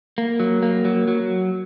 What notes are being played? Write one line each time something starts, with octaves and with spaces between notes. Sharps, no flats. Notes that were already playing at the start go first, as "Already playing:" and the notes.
A#3
F#3
A#3
F#3
F#3